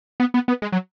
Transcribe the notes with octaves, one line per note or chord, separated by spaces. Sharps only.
B3
B3
B3
G#3
F#3